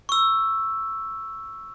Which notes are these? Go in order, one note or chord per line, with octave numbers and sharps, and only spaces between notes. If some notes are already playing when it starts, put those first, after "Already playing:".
C#6 E6